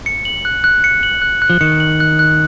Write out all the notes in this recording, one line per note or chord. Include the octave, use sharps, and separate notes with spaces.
C#7
F#7
F#6
F#6
C#7
F#7
F#6
F#6
F3
D#3 C#7
F#7
F#6
F#6